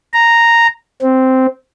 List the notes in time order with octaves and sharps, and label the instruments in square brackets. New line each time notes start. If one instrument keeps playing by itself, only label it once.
[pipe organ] A#5
C4